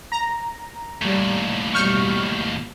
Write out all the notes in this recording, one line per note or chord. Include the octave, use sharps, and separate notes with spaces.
A#5
D#2 A2 G3
B2 G3 C#6 F6 G6